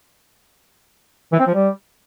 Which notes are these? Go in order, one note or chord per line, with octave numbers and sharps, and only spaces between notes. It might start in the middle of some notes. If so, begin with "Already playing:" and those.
E3
C4
F3
G3